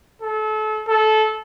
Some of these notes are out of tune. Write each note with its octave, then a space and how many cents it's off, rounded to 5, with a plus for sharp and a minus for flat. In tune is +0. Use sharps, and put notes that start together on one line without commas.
A4 -30
A4 -20